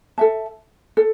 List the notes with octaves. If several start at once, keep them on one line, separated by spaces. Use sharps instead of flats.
A4 E5 A5
A4